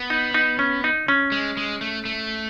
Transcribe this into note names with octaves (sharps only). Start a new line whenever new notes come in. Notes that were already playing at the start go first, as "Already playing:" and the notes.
Already playing: B3
D#4
D#4
C#4
D#4
C#4
G#3
G#3
A3
A3